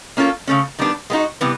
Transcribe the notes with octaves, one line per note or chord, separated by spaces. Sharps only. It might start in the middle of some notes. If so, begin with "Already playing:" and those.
A#3 C#4 F4 A4
C#3 E3 A3 C#4
D#3 G3 B3 D4
G#3 B3 D#4 F#4
C3 E3 G3 B3